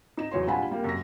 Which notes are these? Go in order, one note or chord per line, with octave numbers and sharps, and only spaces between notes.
D#4 E7
E2 F#3 C#5 C6
A#1 G3 F4 F#5 G#5 B5
G3 A#3
F#2 A#6